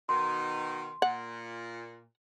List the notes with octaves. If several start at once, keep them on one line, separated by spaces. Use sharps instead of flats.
B2 D#3 C6
A#2 F#5